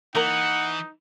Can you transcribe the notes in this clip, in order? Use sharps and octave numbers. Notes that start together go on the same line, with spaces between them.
E3 A#3 D#4 A#4 F#5